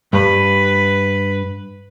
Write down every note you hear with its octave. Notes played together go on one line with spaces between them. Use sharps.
G2 B4